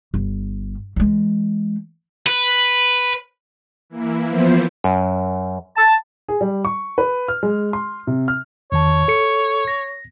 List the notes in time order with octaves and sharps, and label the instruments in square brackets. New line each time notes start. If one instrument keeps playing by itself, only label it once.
[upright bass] G1
E3 G#3
[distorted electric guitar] B4
[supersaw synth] E3 A#3 E4
[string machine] F3 B3 C5
[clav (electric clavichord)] F#2
[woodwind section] A5
[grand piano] G#4
G3
C#6
B4
F6
G#3
C6
C3
F6
[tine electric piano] E2 D#3 A5 [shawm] C#5
[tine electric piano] A4 C#7
A#6